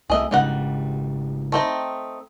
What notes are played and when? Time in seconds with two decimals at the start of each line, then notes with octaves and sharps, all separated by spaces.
0.10 C2 A3 G#4 D#5 E5
0.31 G#1 C#3 G3 G#3 D#4 F#5
1.52 A3 C4 D#4